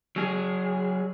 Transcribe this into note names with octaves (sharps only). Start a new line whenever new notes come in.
F#3 G#4